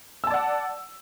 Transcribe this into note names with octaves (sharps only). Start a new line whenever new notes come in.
D5 F#5 A5 E6